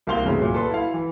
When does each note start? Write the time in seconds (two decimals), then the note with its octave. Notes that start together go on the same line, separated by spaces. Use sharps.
0.07 C2 A#3 C4 F5 C6 G7
0.25 C2 A2 C#3 E3
0.42 A#2 F#3
0.54 A4 B4 C6
0.71 E4 F5
0.94 E3